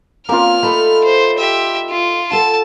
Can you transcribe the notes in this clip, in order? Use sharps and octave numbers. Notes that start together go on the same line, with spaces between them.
A#3 C4 C#4 F4 A#4 F6
A3 D#4 A4 B5
C5
G4 E5
F4
A4 F#5 A5